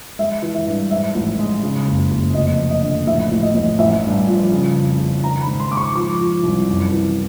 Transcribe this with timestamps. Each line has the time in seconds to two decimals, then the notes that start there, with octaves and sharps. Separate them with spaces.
0.19 G#3 E5
0.42 E3
0.55 E5
0.67 G2
0.91 G#2 E5
1.15 A1
1.39 G#3
1.63 C#3
1.87 F#1
2.11 F#1
2.34 F1 D#5
2.59 F1
2.71 D#5
2.82 D3
3.07 A1 E5
3.31 A1
3.43 D#5
3.55 A1
3.79 A1 E5
4.04 G2
4.27 F3
4.52 C#3
4.76 F2
4.99 C#3
5.24 D#3 A#5
5.41 B5
5.47 G#2
5.60 C6
5.71 G#2 D6
5.77 C#6
5.95 F3 D6
6.20 F3
6.43 C2
6.68 F#2
6.92 E3